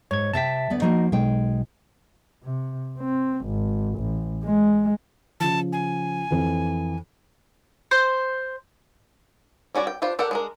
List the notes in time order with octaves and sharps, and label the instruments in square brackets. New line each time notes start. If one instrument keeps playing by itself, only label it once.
[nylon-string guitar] G#2 [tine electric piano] C#5 G#6
[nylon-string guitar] C3 E5 G5 [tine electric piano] A5 A6 B6
[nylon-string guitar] D2 B3 D5
[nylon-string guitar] F3 A#3 F#4 [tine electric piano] D#4
[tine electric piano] B1 [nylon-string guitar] G#3 G5
[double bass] C3
C4
G#1
A1
G#3
[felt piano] C#3 F3 [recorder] A5
[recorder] G#5
[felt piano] F2 E3
[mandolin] C5
[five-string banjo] G3 C#4 F#4 D5
G5
D4 F4 G4 C5
G4 A4 A#4 D5 F#5
G#3 D4 A#4